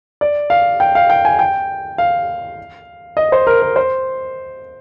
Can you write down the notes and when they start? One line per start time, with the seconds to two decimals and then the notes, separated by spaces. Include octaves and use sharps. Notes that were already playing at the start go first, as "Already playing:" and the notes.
0.21 D5
0.50 F5
0.80 G5
0.95 F5
1.10 G5
1.25 G#5
1.39 G5
1.98 F5
3.17 D#5
3.32 C5
3.47 A#4
3.62 A#4
3.76 C5